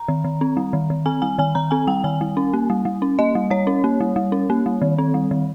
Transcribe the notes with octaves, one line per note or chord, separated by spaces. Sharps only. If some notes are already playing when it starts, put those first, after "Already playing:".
Already playing: A#5
D#3
D#3
C4
G3
D#3
D#3
C4 G#5
G3 G#5
D#3 G#5
D#3 A#5
C4 G#5
G3 G5
D#3 G#5
G3
C#4
A#3
G3
G3
C#4
A#3 D#5
G3
G3 C#5
C#4
A#3
G3
G3
C#4
A#3
G3
D#3
C4
G3
D#3